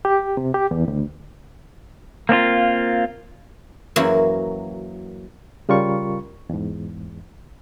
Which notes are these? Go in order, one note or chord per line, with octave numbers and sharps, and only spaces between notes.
G4
C3
G4
E2
D2
A#3 C4 D4 F4
F#2 E3 F#3 A#3 F#4
C#3 G3 F4 A#4 C#6
E2 G#2